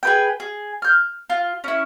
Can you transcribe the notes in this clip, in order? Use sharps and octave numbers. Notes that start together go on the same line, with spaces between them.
G#4 B4 G5
G#4
F6 G6
F4
C#4 E4